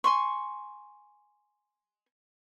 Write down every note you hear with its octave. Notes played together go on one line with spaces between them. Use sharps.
G#5 C6 C#6